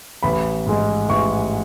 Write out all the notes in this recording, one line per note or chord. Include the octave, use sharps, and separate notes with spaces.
A1 B5
G#2 G#3
A1 C#6